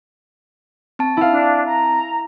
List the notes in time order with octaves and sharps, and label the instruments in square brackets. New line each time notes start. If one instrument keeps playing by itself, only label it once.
[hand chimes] C4 A5
[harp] E4 F5
[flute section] D4
A#5